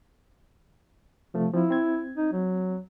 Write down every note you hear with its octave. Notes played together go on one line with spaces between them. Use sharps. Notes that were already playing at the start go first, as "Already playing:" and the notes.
C3 F3 A3
F3 C4 E4
C4 G#6
D#4
F#3